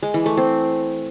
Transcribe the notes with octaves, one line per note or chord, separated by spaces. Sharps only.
G#3
E3
A3
C4